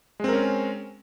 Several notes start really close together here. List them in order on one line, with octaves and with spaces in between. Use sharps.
G#3 C4 A#4 C#4